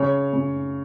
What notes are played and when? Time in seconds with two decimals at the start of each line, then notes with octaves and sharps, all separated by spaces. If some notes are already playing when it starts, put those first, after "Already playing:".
Already playing: C#3 C#5
0.33 C#3